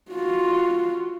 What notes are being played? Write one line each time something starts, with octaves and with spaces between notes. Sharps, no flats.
F4 F#4